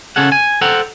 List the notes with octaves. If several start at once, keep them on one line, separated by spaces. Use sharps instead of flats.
C#3 C#4 G#4 A4 F#5
G#5
A4 C5 F#5 G5 A#5